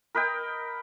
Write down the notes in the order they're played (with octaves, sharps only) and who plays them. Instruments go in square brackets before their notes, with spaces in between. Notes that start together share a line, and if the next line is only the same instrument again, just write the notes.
[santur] A#4 B4 D#5 G5